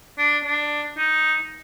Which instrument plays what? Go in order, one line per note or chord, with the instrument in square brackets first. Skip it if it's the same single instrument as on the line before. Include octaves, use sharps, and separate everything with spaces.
[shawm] D4
D4
D#4